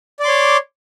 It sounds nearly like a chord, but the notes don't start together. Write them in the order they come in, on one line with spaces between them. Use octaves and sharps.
D5 D6 C6 C#5